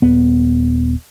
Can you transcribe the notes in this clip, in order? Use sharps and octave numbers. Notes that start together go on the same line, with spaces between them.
D#1 B3